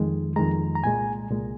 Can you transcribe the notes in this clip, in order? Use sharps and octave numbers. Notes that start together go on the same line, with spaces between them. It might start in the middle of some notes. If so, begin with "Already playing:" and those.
Already playing: F2 D#3 G#3
F2 D#3 G#3 A#5
A#5
C2 A#2 G#3 G#5
C2 A#2 G#3